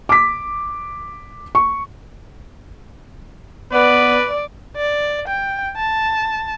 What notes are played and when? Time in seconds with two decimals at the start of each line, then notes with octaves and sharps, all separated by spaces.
0.09 D6 B6
1.55 C#6
3.73 B3 B4 D5
4.77 D5
5.27 G5
5.76 A5